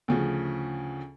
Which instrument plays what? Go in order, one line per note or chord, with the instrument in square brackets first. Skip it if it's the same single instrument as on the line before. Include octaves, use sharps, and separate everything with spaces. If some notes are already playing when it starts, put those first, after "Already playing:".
[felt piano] D2 C#3 F3